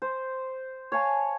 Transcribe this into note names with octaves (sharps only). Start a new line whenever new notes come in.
C5
C#5 F5 G#5 A5